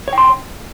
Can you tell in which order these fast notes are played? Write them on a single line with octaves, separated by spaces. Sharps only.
C#5 G5 C6